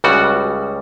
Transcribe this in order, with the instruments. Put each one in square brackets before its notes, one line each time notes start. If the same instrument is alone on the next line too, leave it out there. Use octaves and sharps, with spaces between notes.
[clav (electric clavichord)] C#2 C#3 G3 F#4